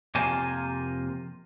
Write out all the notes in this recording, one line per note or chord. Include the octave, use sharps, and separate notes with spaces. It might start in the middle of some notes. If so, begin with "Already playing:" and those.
F2 C3 A#3 F4 C5 G#5